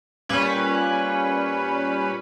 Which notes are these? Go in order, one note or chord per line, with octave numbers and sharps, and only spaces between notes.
A#2 G3 C#4 B4